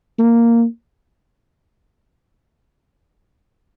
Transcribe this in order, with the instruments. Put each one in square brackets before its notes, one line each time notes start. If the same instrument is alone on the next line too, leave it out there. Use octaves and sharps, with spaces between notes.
[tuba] A#3